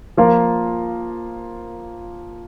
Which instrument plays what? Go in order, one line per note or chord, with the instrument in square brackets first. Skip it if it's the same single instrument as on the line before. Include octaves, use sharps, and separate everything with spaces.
[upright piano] F3 A#3 F4 A#4